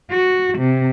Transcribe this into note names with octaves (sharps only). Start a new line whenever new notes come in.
F#4
C3